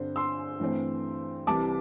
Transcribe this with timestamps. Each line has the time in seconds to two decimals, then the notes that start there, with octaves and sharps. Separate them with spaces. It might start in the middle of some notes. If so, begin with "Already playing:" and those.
Already playing: G2 D3 C4 C5
0.16 C6 E6
0.59 G2 E3 A3 C4
1.47 C2 C3 E3 G3 A5 D6